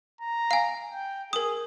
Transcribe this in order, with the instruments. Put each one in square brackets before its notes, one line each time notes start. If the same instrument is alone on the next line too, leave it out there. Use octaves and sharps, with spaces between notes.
[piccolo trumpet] A#5
[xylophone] F5 G#5
[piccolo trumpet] G5
[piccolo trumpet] G#4 [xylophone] A#4 D#6